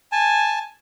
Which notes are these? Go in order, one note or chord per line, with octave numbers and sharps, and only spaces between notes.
G#5 A5